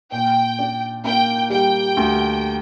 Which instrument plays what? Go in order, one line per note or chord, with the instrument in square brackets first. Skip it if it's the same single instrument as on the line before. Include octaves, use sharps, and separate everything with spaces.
[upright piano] A#2 [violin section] G5
[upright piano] D4
[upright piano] A#3 [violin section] G5
[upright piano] G3 [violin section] G5
[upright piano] D2